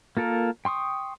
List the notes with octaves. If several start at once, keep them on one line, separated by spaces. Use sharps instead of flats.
A#3 F4 A4 A#4
G5 C6 C#6 D#6